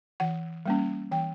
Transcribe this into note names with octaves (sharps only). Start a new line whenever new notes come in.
E3 F#5
G3 A#3 C#4
E3 G5